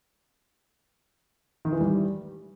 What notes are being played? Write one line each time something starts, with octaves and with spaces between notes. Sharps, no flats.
D#3
E3
G3